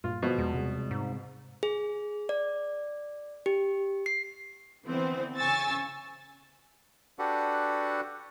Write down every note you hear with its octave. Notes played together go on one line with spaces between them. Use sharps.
G2 A#2 F4
B2 F3
E2 G#3
C3 G3 G#3
G#2
G#4
D5
G4
C7
D3 E3 B3 C4 C5
C#3 G#5 C#6 E6 A6
D4 F#4 G4 A4 B4 F#5